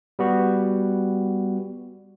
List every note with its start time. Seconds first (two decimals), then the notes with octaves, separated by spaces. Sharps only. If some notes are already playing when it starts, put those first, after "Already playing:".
0.19 G3 B3 F#4